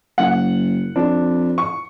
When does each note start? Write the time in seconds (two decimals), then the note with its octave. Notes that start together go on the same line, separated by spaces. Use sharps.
0.18 F#1 F#5
0.96 F2 D4
1.58 C#6